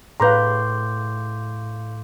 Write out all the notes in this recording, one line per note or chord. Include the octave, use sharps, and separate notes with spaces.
A2 B4 F5 A#5 C6 D6 G6